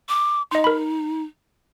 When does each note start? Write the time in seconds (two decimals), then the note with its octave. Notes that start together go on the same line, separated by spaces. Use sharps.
0.09 D6
0.51 D#4 D#5 C6
0.64 A#4 B5